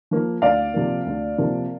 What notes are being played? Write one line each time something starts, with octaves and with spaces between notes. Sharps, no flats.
F3 A#3
D2 D5 F5
C3 F3 A#3
D2
C3 F3 A#3